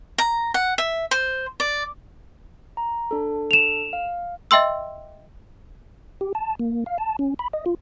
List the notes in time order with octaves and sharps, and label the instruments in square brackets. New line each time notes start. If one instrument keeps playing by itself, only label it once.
[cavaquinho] A#5
F#5
E5
C5
D5
[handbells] A#5
D4 A4
[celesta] E7 F7
[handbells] F5
[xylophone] D#5 E5 G5 C6 E6
[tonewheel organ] G4
A5
A#3
F5
A5
C#4
B5
D#5
F4